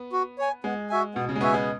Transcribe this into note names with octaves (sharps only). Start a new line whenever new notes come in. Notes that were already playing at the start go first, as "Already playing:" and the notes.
Already playing: B3
F#4
C#5 G#5
G#3 B3
F#4 E5 G#5
B2 B3
C#3
G#3
B3 F#4 E5 G#5
G#3